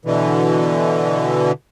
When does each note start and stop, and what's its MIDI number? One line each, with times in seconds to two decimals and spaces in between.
0.05 1.52 47
0.05 1.52 50
0.05 1.52 52